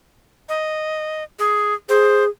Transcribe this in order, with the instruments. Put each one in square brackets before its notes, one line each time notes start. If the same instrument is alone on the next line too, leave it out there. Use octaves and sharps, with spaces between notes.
[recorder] D#5
G#4
[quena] G#4 [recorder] C5